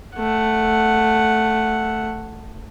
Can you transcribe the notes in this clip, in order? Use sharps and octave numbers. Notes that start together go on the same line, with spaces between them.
A3 F#5